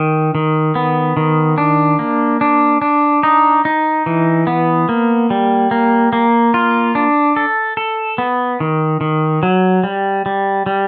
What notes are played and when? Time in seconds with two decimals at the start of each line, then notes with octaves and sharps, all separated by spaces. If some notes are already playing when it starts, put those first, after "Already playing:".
Already playing: D#3
0.35 D#3
0.75 B3
1.17 D#3
1.58 D4
1.99 A#3
2.41 D4
2.82 D4
3.23 D#4
3.65 D#4
4.06 E3
4.47 B3
4.89 A#3
5.30 G3
5.71 A#3
6.13 A#3
6.54 F4
6.95 D4
7.36 A4
7.77 A4
8.18 B3
8.60 D#3
9.01 D#3
9.43 F#3
9.83 G3
10.26 G3
10.66 G3